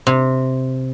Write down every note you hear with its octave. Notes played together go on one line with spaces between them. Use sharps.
C3